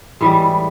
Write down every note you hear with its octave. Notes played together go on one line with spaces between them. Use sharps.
A2 E3 G3 G#3